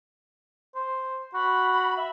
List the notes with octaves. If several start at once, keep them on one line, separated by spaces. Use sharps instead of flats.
C5
F#4 B5
E5